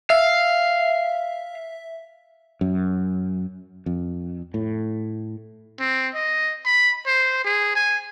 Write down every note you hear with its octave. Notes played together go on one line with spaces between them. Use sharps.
E5 F5
F#2
F2
A2
C4
D#5
B5
C5
G#4
G#5